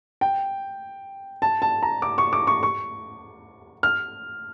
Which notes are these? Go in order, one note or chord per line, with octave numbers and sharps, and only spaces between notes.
G5
A5
A5
A#5
D6
C#6
D6
C#6
C#6
F6